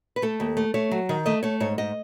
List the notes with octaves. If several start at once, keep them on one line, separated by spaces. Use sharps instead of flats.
B4
A3 A4
D#2
A3
A3 C#5
F#3
D#3
A3 D#5
A3 C#5
G#2 C#5
G#2 D#5